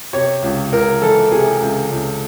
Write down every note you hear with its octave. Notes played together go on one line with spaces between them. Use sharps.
C3 C#5
C#2
C#2 A#4
E3 A4
C3 G#4
C#2
C#2